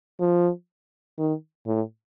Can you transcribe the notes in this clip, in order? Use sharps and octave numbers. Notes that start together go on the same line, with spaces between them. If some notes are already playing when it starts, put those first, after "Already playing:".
F3
D#3
A2